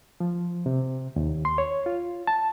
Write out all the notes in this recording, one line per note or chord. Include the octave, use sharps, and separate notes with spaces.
F3
C3
D#2
C6
C#5
F4
A5